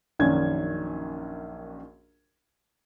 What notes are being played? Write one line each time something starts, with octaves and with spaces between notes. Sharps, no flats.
A#1 F#2 D#3 C#4 D4 G#6